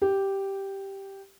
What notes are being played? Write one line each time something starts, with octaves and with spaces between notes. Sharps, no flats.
G4